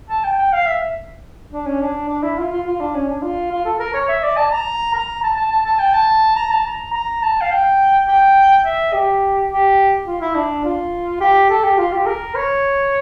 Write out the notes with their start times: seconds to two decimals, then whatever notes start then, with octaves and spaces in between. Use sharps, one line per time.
0.10 A5
0.24 G5
0.38 G5
0.52 F5
0.67 E5
1.53 D4
1.66 C#4
1.81 D4
2.09 D4
2.23 E4
2.38 F4
2.52 F4
2.67 F4
2.81 D4
2.95 C#4
3.08 D4
3.23 F4
3.51 F4
3.65 A4
3.80 A#4
3.94 C#5
4.09 E5
4.24 D5
4.37 A5
4.52 A#5
4.94 A#5
5.23 A5
5.36 A5
5.52 A5
5.66 A5
5.79 G5
5.94 A5
6.36 A#5
6.51 A5
6.66 A#5
6.94 A#5
7.23 A5
7.41 F5
7.51 G5
8.08 G5
8.65 E5
8.93 G4
9.50 G4
10.07 F4
10.21 E4
10.35 D4
10.65 F4
11.21 G4
11.50 A4
11.64 G4
11.78 F4
11.92 G4
12.06 A#4
12.35 C#5